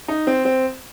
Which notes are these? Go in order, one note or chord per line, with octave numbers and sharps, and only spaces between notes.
D#4
C4
C4